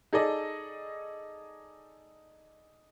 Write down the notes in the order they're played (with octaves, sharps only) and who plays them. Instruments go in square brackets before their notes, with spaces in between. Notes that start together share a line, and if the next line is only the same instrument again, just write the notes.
[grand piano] D#4 G#4 A4 D5 D#5